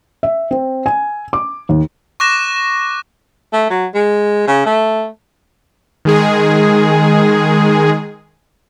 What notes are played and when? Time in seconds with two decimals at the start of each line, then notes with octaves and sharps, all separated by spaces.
0.23 E5
0.51 C4
0.86 G#5
1.33 D6
1.69 D#2
2.20 C#6 D6 F#6 A#6 E7
3.53 A3
3.70 F#3
3.94 G#3
4.47 C#3
4.66 A3
6.05 D#3 G#3 G#4